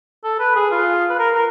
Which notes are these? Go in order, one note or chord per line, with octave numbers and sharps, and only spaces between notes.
A4
B4
G#4
F4
B4
A#4
A#4